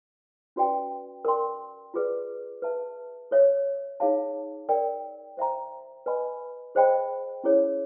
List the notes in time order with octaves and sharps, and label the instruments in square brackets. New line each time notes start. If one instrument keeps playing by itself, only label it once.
[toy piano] C#4 F#4 B4 D5 G5
A#4 D5 G5 C6
F4 G#4 B4 D5
B4 E5 A5
A4 C#5 E5
D#4 G#4 C#5 F5 A5
A#4 D5 G5
C5 E5 G5 A#5
B4 D#5 G#5 B5
G#4 C5 D#5 G5 B5
C#4 E4 G#4 C#5